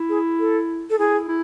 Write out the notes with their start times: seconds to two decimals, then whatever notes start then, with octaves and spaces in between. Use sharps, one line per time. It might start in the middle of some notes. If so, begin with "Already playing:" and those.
Already playing: E4
0.09 G#4
0.39 A4
0.90 A4
0.99 E4 G#4
1.28 E4